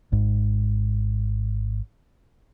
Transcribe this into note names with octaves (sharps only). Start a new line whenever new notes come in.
G#1 G#2